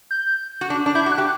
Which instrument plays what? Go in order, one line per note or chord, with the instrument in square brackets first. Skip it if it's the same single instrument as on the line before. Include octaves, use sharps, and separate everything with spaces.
[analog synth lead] G6
[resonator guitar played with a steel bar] F#4
D4
D4
[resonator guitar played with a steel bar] E4 [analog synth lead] G6
[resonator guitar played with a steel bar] F#4
[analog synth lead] F#6
[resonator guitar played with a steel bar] G4